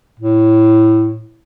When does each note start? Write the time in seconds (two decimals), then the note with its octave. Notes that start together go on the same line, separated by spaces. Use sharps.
0.19 A2